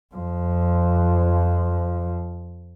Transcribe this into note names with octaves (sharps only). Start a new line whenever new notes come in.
F2 F3